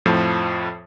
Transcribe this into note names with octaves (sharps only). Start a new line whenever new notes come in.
F2 A2 F3